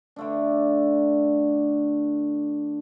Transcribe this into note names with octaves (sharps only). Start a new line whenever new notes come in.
D3 A3 D4